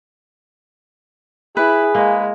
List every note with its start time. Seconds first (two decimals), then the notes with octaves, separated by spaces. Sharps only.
1.57 E4 G#4 B4
1.95 G#3 A#3